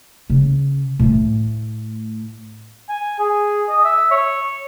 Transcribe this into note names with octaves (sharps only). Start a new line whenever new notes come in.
C#3
A2 A3
G#5
G#4
D#5
E5
C#5